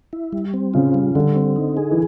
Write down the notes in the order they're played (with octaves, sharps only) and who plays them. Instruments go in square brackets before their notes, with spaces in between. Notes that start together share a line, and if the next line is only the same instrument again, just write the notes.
[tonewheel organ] E4
G3
C4
[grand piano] C#3 [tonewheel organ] F4
[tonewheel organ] G3
[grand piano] D3 [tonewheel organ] G3
[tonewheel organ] C4
D#4
G#4
[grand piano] E3